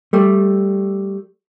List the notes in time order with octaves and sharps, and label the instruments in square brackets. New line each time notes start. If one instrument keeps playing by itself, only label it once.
[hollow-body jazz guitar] G3 A3